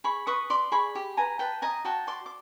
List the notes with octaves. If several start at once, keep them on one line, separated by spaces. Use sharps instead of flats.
G#4 B5 C#6
B4 C#6 D#6
D5 C6 D6
G#4 B5 C#6
G4
B4 G#5 A#5
B4 G5 A5
D#5 G#5 A#5
F#4 G5 A5
D5 C6 D6
D6